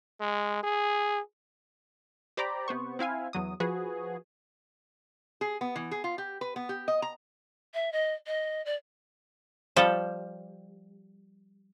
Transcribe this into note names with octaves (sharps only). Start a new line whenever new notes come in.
G#3
G#4
G4 C5 D5 A#5 B5 D6
C3 B3 C5 C#6
C4 E4 F5 G#5
E2 F#3 D#6
F3 F#4 G#4 B4
G#4
B3
E3
G#4
F4
G4
B4
B3
G4
D#5
A#5
E5
D#5
D#5
D5
F3 G3 A4